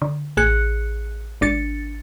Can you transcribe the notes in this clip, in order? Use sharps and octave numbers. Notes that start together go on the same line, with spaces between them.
D3
A1 G#4 F#6 C#7
G#1 D4 A6 C#7